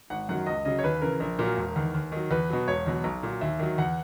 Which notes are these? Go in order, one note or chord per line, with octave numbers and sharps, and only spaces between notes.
G#1 F#5
F#2 D#3 F#3 F#5
C#2 D#5
C#3 F#3 D#5
C#5
D#2 B4
C#3 E3 A#4
A#1 A#4
A#2 F#3 A#4
E1
E2 D#3
D#2
D#3 F#3
E2 B4
B2 F#3
E1 C#5
E2 B2 F#3
B1
A#2 F#3
D#2 E5
D#3 F#3
E2 F#5